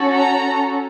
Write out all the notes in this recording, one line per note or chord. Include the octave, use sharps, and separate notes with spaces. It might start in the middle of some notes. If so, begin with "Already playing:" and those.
Already playing: C#4 F#4 A4
A#5